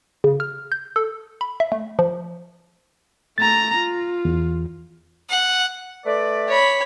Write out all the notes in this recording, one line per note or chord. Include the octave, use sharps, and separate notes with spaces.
C#3
F6
G6
A4
B5
E5
A3
F3
A3 A#5 A6
F4
E2
F#5
A3 B4 D5
C#5 B5